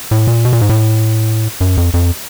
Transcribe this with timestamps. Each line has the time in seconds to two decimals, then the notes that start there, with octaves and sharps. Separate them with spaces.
0.11 A2
0.27 A#2
0.45 B2
0.53 A#2
0.61 G#2
0.69 A2
1.61 F#2
1.77 F2
1.94 F2